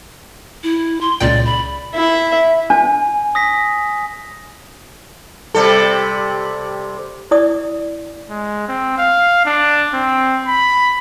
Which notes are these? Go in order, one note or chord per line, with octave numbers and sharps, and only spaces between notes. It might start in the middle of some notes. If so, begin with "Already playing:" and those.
E4
C6
C#2 A#2 D5 G5
B5
E4 E5
D4 G#5
D#6 A#6 B6
C3 G3 A4
E4 D5 D#6
G#3
C4
F5
D4
C4
B5